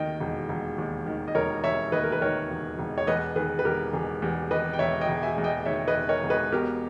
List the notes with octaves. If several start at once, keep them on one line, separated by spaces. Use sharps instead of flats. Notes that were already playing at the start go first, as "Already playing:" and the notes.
Already playing: D#2 D#3 D#5 G5
E1
E1
D#2
D#3
D#5
E1 A#4 C#5
E1 C#5 E5
D#2 B4 D#5
A#4
B4
D#3 A#4 C#5
E1
E1
C#5
E2 B4 D#5
D#3 G#4 B4
B4
E1 G4 A#4
E1 G#4
E2 G4
D#3 B4 D#5
G5
E1 C#5 E5
D#5 G5
E1
E5 G#5
E2
D#5 G5
D#3 C#5 E5
B4 D#5
E1
A#4 C#5
E1
B4 D#5
B2 G4 A#4